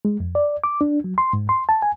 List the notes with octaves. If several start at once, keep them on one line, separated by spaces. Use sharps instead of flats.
G#3
F2
D5
D6
D4
F#3
C6
G#2
C6
A5
G#5